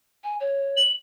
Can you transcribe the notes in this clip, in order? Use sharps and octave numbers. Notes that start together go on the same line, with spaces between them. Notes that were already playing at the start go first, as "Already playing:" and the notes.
G#5
C#5
F#7